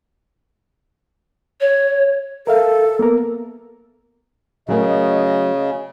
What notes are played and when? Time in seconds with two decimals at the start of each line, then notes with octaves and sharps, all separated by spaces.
1.61 C#5
2.47 A4 A#4 E5 F5
2.99 A#3 B3 A#4
4.68 C#3 F#3 A3 A#4 D#5